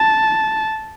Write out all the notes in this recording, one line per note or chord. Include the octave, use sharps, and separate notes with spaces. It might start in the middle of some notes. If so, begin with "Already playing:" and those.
Already playing: A5